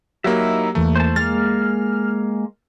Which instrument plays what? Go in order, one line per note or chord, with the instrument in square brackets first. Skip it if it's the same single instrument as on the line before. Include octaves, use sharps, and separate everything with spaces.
[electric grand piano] F#3 A#3 [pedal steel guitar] D#4 E4 E5 [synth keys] G4
[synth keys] E2 E3 A#3 [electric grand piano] A3
[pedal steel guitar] C5 A5
[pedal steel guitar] G#3 A#3 [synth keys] F6 [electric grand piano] A6